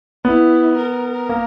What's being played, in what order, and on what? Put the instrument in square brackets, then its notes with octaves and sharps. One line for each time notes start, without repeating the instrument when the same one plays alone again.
[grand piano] B3 [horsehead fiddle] E4
[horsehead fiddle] A#4
[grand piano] A#3